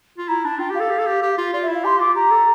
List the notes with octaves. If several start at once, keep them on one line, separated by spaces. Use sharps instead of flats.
F4
E4 A#5
D4 A5
F4 G5
G4
F5
A4
G4
A4
G4
G4
F4
F4 D5
E5
E4
F5
G4 C6
F4 D6
G4 A#5
A4